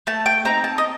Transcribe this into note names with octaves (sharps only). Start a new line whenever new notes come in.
A3 A5
G5
C4 D#4 A#5
A5
D#5